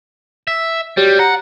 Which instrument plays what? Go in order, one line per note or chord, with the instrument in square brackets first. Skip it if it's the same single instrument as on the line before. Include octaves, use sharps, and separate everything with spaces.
[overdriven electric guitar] E5
[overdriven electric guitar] G3 [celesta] F#4 G4 C#5
[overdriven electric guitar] F#5 [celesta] A#5 A#6